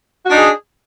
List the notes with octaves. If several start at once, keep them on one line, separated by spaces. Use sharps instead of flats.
D4 D#4 F#4 G#4